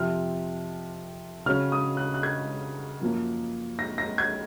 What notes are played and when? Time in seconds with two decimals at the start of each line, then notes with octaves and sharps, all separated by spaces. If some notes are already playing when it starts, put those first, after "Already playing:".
Already playing: F2 C3 F3 C4 F6
1.46 C#3 F#3 C#4 F6
1.72 D#6
1.97 F#6
2.14 F#6
2.23 G#6
3.02 F#2 F3 A#3
3.79 A#6
3.98 A#6
4.18 G#6